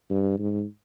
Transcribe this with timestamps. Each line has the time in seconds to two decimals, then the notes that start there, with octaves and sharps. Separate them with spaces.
0.10 G2
0.38 G#2